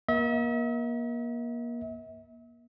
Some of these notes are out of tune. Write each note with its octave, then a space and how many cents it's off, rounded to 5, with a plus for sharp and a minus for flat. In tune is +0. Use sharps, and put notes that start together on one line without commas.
A#3 +35 E5 -40